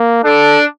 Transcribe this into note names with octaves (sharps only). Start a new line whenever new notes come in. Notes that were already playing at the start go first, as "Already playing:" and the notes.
Already playing: A#3
D4 A4